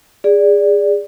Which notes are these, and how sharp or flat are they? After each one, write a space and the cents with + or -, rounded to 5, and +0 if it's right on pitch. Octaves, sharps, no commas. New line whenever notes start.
G#4 -20 D5 -5